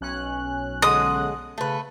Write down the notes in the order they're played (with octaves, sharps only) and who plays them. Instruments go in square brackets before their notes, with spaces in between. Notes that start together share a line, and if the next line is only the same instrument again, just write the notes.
[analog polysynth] B1 C#4 F#6
[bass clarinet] D3 [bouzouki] G#3 [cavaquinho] D#6
[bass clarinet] C#3 [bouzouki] A3 B4